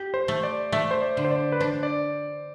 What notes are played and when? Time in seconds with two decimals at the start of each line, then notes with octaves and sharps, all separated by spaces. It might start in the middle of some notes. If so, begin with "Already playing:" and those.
Already playing: G4
0.14 C5
0.28 A3
0.43 D5
0.72 A3 E5
0.91 C5
1.02 D5
1.17 D3
1.24 C5
1.31 D5
1.52 B4
1.61 D4 C5
1.83 D5